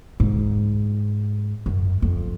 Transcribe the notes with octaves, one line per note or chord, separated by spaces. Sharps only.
G#2
F#2
F2